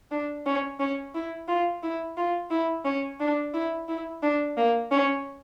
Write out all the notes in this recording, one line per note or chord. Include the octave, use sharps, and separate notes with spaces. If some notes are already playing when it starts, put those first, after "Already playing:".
D4
C#4
C#4
E4
F4
E4
F4
E4
C#4
D4
E4
E4
D4
A#3
C#4